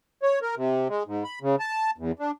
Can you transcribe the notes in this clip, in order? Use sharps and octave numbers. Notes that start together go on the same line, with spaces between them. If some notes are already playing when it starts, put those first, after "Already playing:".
C#5
A#4
C3
G#3
G#2
B5
C#3
A5
E2
D4